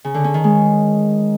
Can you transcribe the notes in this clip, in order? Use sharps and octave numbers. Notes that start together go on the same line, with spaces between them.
C#3
D3
C#4
D#3
G#3